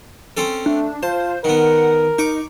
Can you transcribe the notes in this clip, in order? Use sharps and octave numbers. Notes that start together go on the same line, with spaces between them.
C4 C#4 A4
A3 D4
F4 C5 A5
D#3 B3 A#4 F#5
D#4 C#6 D6